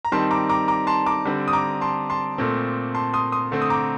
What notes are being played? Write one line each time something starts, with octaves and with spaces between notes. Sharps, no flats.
A#5
D#3 G3 C4 A5 C6
A#5 D6
A#5 D6
A#5 D6
A5 C6
A#5 D6
D3 G3 C4
D#6
A#5 D6
A5 C6
A5 C6
A#2 A3 C4
A5 C6
C6 D#6
C6 D#6
D3 A3 C4
D#6
A#5 D6